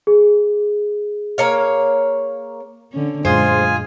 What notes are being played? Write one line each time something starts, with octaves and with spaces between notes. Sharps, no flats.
G#4
A#3 C#5 F5
D3 C#4
F#2 A#2 G#3 F4 G#4 C5 G#5